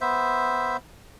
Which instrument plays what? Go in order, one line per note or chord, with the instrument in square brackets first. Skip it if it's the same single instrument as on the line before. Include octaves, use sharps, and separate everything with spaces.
[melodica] B3 C5 E5